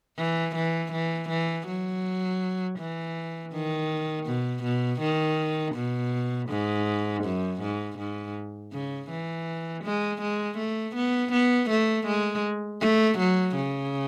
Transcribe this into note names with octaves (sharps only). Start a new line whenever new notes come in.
E3
E3
E3
E3
F#3
E3
D#3
B2
B2
D#3
B2
G#2
F#2
G#2
G#2
C#3
E3
G#3
G#3
A3
B3
B3
A3
G#3
A3
F#3
C#3